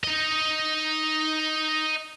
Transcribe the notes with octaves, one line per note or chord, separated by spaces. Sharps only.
D#4 D#5